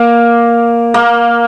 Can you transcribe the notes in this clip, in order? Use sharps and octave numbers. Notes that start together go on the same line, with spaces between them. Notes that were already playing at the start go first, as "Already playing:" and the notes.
Already playing: A#3
A#3